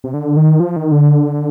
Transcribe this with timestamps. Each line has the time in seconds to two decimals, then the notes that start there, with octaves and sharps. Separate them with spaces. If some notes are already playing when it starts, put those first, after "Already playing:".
0.04 C3
0.14 D3
0.37 D#3
0.60 F3
0.76 D#3
0.92 D3